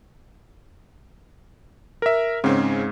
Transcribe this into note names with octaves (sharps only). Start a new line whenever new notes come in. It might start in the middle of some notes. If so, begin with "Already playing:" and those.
A#4 E5
G#2 C#3 C4 C#4